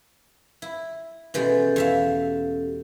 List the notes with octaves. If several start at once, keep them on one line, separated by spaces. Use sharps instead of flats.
E4
B2 E3 G#3 C#4 G4 A4
E2 E5 F5